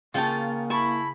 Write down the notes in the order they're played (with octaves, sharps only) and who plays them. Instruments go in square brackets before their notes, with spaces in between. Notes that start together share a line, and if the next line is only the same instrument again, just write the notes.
[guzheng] C#3 C#4 [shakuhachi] A#3 [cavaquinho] F4 G5 A5
[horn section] E4 B5 [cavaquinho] A5 C#6